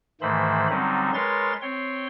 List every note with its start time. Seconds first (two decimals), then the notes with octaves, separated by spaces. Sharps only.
0.21 G#2 D#3 E3 A3 C5 B5
0.70 D3 F#3 G3 C4 C#4 D#4
1.14 G#3 A#4 B4 C#5 C6 A6
1.62 C4 C#5 G5 C6